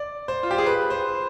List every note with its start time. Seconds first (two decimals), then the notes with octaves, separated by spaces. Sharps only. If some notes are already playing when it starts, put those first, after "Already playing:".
Already playing: D5
0.28 C5
0.43 F4
0.51 G4
0.58 G#4
0.66 B4
0.90 C5